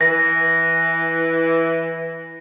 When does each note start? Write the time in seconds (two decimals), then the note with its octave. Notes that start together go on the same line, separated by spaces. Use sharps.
0.01 E3 A#6